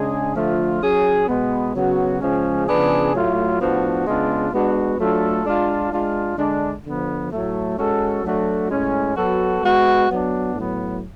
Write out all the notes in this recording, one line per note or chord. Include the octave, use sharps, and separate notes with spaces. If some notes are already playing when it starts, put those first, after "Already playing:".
Already playing: C#3 G#3 D4 G#4
D3 F3 A3 F4
F#3 C#4 G#4
B2 G#3 B3
C#3 F#3 B3 F#4
C#3 F3 G#3 C#4
C#3 F3 B3 D4 G#4
A2 F#3 A3 F4
A2 F3 B3 D4 F#4
C#3 G#3 B3 D4 F4
G#3 B3 D4 F#4
F#3 A3 D4 F4 A4
G#3 D4 F4
G#3 D4 F4
D3 G#3 D4
D3 F3 B3
A2 F#3 A3
G#3 C#4 F#4 A4
F#3 A3 D4 F#4 A4
A2 G#3 C#4
F#3 B3 F#4 A4
G#3 B3 F#4
F#3 B3 D4
A2 F#3 B3